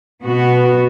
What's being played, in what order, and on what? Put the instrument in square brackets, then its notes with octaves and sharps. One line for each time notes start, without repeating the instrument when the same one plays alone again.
[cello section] B2 B3 F#4